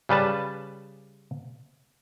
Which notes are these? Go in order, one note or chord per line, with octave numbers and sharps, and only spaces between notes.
C#3 G3 B4 A5